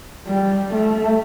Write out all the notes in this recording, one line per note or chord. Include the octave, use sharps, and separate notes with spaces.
G3
A3